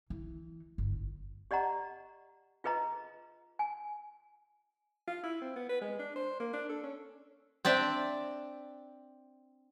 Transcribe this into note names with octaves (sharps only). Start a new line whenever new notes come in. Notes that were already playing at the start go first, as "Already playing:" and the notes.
E3
G1
G4 D5 D#5 F#5 A#5
F4 G#4 B4 D#5 A#5
G#5
F4
E4
C4
B3
B4
G#3
D4
C5
A#3
D4
A4
C#4
C4 D4 D5 E5